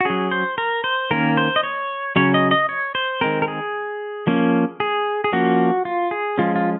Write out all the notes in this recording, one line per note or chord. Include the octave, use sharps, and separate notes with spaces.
F#4
F#3 C#4 G#4
C5
A#4
C5
D#3 A#3 C#4 A#4
C5
D#5
C#5
C#3 F#3 C#4 C#5
D#5
D#5
C#5
C5
D#3 G#3 C4 A#4
A#4
G#4
F3 A#3 C#4
G#4
G#4
F3 A#3 C#4 F#4
F4
G#4
F3 G#3 C#4 F4
F4